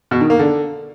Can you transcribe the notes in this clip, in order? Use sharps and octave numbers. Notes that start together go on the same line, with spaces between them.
B2
D#3
A#3
D3